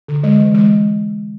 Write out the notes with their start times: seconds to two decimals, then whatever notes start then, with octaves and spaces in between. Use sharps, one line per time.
0.08 D3
0.24 G#3
0.39 E3
0.54 G#3